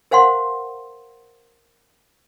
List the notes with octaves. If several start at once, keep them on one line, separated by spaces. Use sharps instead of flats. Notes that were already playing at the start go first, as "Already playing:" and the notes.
A#4 C5 F5 F#5 C6